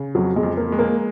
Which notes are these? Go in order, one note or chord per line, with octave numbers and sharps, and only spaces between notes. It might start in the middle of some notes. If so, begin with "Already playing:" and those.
Already playing: C#3
F2 F#3
G#3
F2
A#3
G#3
A#3